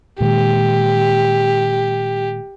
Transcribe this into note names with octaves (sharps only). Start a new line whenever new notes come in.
A#2 D#3 G#3 G4